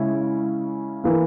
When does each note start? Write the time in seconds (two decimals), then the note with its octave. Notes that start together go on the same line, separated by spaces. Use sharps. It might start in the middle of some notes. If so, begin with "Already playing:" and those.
Already playing: C#3 G#3 C#4 E4
1.04 E3 A#3